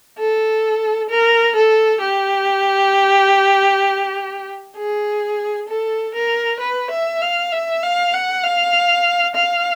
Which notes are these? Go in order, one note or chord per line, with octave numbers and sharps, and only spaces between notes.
A4
A#4
A4
G4
G#4
A4
A#4
B4
E5
F5
E5
F5
F#5
F5
F5